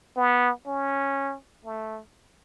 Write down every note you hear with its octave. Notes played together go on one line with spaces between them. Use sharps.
B3
C#4
A3